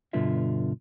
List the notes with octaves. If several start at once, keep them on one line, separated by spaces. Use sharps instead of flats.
G2 B2 D3 F4 E5